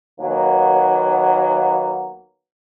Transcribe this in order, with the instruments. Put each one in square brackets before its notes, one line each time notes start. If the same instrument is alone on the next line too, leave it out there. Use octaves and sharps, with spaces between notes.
[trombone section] D#2 F#3 A#3 B3